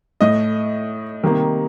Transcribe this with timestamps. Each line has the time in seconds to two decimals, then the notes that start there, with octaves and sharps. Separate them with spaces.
0.21 A2 A3 D#5
1.23 C3 D#3 G3 A#3